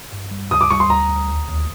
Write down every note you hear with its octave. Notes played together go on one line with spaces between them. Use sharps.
G2
G3
D2 D#6
D6
G3 C#6
C6
D2 A#5
D2
D#2
D#2